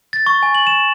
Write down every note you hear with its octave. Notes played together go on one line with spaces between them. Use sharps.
A6
C#6
G#5
F#7
E7